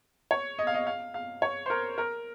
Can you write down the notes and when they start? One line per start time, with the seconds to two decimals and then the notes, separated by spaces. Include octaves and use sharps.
0.31 C#5
0.59 D#5
0.67 F5
0.74 D#5
0.87 F5
1.14 F5
1.42 C#5
1.66 C5
1.70 A#4
1.98 A#4